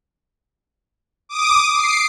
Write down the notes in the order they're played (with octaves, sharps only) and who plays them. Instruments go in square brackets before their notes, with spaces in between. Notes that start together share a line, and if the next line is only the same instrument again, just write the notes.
[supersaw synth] D6 D#6
C7 D7